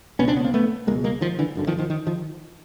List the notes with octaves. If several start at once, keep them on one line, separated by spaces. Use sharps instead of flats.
C#2 B2 B3 C#4
C4 D4
B3 C#4
A#3 C4
A3 B3
C#2 B2 G#3 A#3
G#3 A#3
D#3 F3
D3 E3
G1 F#2 D3
D#3 F3
D#3 F3
D#3
D#3 F3